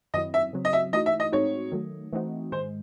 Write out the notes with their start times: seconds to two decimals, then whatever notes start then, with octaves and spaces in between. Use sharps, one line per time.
0.14 F#2 D#3 F#3 C4 E4 D#5
0.34 E5
0.53 C#3 F#3 C4
0.65 D#5
0.73 E5
0.93 E3 A3 D#4 F#4 D#5
1.06 E5
1.20 D#5
1.32 A2 G#3 C4 D#4 F#4 C#5
1.72 D#3 F#3 A3
2.13 E3 A3 C4 D#4 F#4
2.52 G#2 D#3 G#3 C5